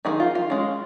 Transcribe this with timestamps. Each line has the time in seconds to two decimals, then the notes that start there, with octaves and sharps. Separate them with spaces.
0.05 D#3 G#3 D#4 G#4
0.20 F4
0.35 F4
0.50 G#3 C#4